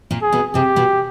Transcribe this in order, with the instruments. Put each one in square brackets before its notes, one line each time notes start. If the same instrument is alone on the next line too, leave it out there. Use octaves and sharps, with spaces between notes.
[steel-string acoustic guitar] A#2 A#3
[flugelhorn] G#4
[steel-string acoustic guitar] B2 B3
[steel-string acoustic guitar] C3 C4 [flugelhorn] G4
[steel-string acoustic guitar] B2 B3